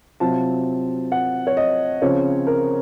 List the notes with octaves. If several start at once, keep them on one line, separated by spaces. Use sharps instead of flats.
C3 F#3 C4 F4 A5
F#5
C#5
D#5
C#3 F3 C4 C#5
A#4